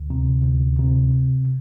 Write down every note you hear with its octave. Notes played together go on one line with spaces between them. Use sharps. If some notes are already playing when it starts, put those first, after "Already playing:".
Already playing: D2
C3
D2
C3